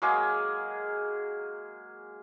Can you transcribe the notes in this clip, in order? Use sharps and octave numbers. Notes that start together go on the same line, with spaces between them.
F#3 G#3 A#3 G#4